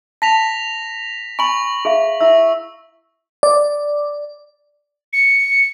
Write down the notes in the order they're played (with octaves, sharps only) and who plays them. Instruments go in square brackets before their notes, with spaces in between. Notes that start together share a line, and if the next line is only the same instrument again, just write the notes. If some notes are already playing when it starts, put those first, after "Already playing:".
[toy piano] A5 [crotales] A#6 B6 F7
[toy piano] G#5 A#5 B5 [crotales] C#6 F#7
[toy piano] G#4 E5 F5
[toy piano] E4 E5 [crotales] E6
[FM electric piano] D5
[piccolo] C#7